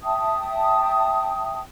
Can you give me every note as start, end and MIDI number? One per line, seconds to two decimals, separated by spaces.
0.03 1.60 76
0.03 1.60 79
0.03 1.60 81
0.03 1.60 87